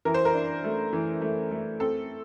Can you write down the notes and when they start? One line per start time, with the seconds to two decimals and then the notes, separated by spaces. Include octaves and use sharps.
0.05 E3 A#4
0.14 C5
0.25 A#4
0.34 D4
0.64 A3
0.93 E3
1.21 A3
1.51 A3
1.80 C4 A4